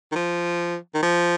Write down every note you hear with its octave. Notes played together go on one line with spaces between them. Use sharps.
D#3
F3
D#3
F3